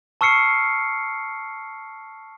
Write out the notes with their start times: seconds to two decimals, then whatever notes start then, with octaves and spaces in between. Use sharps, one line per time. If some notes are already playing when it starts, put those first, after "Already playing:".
0.21 A5 C#6 E6 F6 C7 C#7